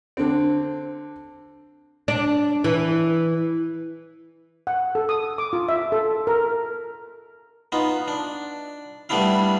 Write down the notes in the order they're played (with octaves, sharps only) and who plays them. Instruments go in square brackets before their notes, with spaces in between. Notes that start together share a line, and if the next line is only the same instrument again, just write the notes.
[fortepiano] D3 C4
[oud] D4
E3
[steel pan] F#5
A4
D#6
D6
F4
E5
A4
A#4
[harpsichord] B3 D#4 F4
D4
G3 A3 B3 D4 E4 F5